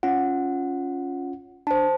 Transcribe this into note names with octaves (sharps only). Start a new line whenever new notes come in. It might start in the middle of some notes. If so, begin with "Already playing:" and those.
C#4 F4 F#5
D4 C5 A5